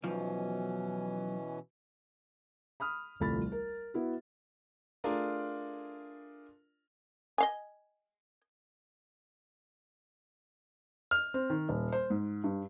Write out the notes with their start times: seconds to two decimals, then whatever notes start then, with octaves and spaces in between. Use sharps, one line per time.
0.03 B1 B2 E3 F3 C#4
2.80 B5 D#6 F6
3.20 D#1 C2 F3 A3 B5 A6
3.52 A#4
3.94 B3 E4 F#4
5.04 A3 D4 F4 G#4 A#4 D5
7.38 D#5 F5 G#5
11.11 F6
11.34 C4
11.50 D#3
11.69 D#1
11.92 C5
12.10 G#2
12.44 G2